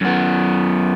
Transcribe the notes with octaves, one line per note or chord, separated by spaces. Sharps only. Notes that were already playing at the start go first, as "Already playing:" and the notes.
F#2 B3